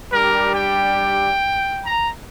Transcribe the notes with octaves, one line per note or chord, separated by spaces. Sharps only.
G3 D4 G4 A#4
G5
A#5